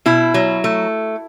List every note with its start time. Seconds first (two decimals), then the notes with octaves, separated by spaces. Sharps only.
0.06 B2 E4
0.34 F#3
0.64 A3